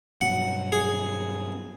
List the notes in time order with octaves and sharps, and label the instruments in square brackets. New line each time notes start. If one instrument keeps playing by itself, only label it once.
[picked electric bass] G2 B2 F#3 [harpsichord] F#5
[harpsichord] G#4